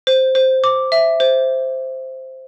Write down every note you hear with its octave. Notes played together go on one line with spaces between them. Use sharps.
C5
C5
D6
E5
C5